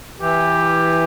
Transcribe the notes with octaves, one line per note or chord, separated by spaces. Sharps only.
E3 G4